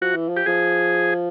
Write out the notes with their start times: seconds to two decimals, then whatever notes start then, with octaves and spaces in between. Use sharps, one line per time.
0.02 F3 F#4
0.14 E3
0.28 F3
0.37 G4
0.46 F3 G#4